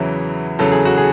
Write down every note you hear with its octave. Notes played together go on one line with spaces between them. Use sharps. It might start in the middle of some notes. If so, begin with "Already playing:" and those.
Already playing: E2 C#3 E3 F#3 E4
E2 C#3 F#3 A4
G#4
F#4
G#4